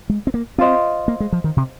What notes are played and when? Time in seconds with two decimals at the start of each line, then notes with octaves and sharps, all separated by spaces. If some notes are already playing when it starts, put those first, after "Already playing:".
0.09 G#3
0.27 C4
0.34 A#3
0.58 C4 F4 C5 D#5
1.08 A#3
1.20 G#3
1.32 F3
1.44 D#3
1.57 C3